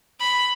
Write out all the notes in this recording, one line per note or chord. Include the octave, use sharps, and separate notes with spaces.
B5